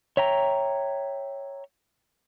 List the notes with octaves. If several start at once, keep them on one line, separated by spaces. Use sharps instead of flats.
C#5 E5 G5 A#5